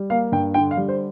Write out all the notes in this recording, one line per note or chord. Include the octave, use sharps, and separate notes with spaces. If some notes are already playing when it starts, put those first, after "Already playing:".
Already playing: G3
A#3 F5
G2 G5
D3 G5
F5
G3
C5